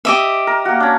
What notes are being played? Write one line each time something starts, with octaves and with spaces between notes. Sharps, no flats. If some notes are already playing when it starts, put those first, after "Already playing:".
G4 D#5 E5
A#4
A#3 F#4
C#4 D4